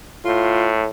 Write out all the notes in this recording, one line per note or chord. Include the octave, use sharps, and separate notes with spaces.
A2 F4